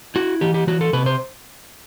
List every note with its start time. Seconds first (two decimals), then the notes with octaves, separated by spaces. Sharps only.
0.16 E4 F#4
0.41 E3 G4
0.54 G4
0.67 E3 F#4
0.81 A4
0.93 C3 B4
1.06 C5